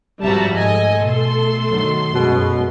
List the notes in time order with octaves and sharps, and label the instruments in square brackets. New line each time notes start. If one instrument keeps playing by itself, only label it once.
[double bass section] G#1 F#2 F3 [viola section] G3 A5 A#5 [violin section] F#4 E5
[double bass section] G#2 [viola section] A3 A4 [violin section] D#5 G#5
[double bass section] B2 [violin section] C6
[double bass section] D#3 F#3
[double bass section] F#2 G#3 [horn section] B2